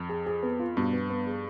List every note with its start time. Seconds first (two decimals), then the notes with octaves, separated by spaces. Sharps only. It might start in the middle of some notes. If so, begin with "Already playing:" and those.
Already playing: F2
0.09 G#4
0.26 G#4
0.43 B3
0.59 F4
0.77 G2 B2
0.93 B3
1.10 B3
1.27 G#4